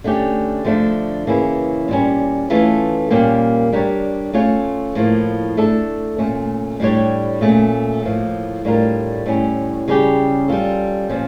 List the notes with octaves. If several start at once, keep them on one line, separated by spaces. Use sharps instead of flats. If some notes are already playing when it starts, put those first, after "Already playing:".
D3 A3 C#4 G4
D3 F3 A3 D4
C#3 E3 A#3 C#4 E4
A#2 G3 C#4
E3 A3 C#4 F4 A4
A#2 G3 A#3 C#4 G4
G3 D4 G4 A#4 C#5
A3 C#4 F4 C#5
A2 F3 A#3
A3 D4 A4
A#2 A3 C#4
A2 G3 D4 G4 C#5
A#2 A3 C#4
A2 F3 A#3
A2 G3 D4 F4 A#4
A2 G3 C#4
C#3 G3 C#4 G4
G3 C#4 F4 A4
A#2 F3 C#4